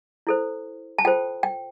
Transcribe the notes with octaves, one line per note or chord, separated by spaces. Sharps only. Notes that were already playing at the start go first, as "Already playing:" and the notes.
E4 A4 C5
A5
F4 A4 C5 G5
G5